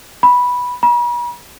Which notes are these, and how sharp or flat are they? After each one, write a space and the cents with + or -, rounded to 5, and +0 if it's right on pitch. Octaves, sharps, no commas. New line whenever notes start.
B5 -5
B5 -45